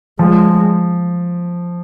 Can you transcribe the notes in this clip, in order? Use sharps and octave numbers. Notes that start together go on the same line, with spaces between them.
F3 G#3